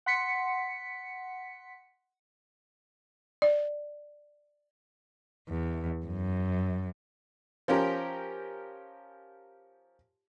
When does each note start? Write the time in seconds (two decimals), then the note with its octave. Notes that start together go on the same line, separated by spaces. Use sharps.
0.06 F#5 C6 B6 C#7
3.42 D5
5.49 E2
6.06 F#2
7.68 F3 C#4 G4 A#4